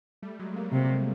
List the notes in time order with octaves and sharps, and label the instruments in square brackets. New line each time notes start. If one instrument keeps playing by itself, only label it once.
[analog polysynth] G3 A3
F#3 G#3
G#3 A#3
[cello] C3 [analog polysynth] G#3
[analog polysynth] G3
F#3 G#3